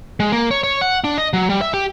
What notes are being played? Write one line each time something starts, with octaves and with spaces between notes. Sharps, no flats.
G#3
A#3
C#5
C#5
F#5
D4
D#5
F#3
G3
E5
G4